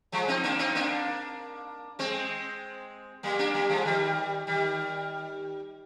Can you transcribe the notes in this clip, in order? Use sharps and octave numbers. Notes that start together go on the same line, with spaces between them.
F3 G#3
C4 D#4
A#3 D4
C4 D#4
A#3 D4
G#3 C4
G3 A#3
A#3 D4
G3 A#3
F3 G#3
D#3 G3
D#3 G3